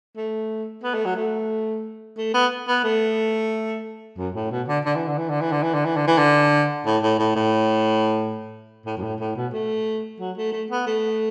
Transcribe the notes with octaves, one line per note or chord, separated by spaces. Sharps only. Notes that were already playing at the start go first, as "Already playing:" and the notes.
A3
B3
A3
F#3
A3
A3
B3
B3
A3
F#2
A2
B2
D3
D3
E3
D3
E3
D3
E3
D3
E3
D3
E3
D3
E3
D3
A2
A2
A2
A2
A2
F#2
A2
A2
B2
A3
F#3
A3
A3
B3
A3